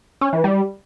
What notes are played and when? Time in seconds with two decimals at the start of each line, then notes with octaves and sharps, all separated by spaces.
0.21 C#4
0.33 E3
0.44 G3